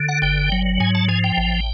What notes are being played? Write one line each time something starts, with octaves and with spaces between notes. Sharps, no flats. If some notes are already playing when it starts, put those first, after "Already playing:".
Already playing: D3
F#5
G1 G5
F#3
G#2 G#5
A5
F3 G#5
G5
A1